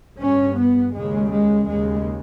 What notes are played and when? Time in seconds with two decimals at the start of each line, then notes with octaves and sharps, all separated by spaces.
0.20 G2 C#4
0.57 B3
0.94 D#2 C#3 G#3
1.31 G#3
1.66 D#2 C#3 G#3